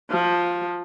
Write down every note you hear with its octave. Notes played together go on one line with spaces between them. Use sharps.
F3